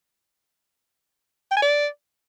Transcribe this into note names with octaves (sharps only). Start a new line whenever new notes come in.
G5
G#5
D5